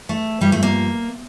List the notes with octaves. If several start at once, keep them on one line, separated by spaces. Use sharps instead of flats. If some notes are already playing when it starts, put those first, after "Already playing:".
A3
G2 F3 G3
A3
A#3